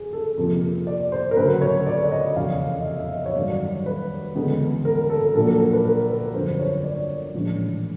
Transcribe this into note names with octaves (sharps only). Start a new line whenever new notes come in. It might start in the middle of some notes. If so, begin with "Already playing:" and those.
Already playing: F#2 G#4
A4
F2 C3 F3 A#3
D5
C5
A#4
D2 C#3 F#3 B4
C#5
D5
D5
D#5
F1 E2 C#3 F5
D#5
E5
E5
D#5
C#5
G2 D#3 F#3 D5
B4
D2 C#3 E3 G#3 B3
A#4
A4
A#1 A#2 F#3 A#3 A4
A4
A#4
B4
A#4
B4
G1 F2 D3 F#3 C5
C#5
D5
A#1 A2 E3 G#3